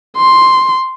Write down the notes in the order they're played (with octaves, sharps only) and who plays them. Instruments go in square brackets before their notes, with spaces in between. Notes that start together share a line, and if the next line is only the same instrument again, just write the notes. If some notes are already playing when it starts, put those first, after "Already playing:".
[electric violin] C6